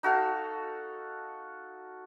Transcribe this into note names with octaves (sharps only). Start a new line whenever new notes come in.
D#4 F#4 A4 F5